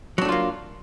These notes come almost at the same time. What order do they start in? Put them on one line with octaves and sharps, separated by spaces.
F#3 D4 A3 F4 A#3